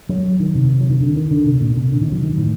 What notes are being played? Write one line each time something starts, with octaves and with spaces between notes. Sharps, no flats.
F#3
D#3
C3
F#3
D#3
D3
D#3
D3
C3
A#2
C3
D3
D#3
F#3
D#3
A2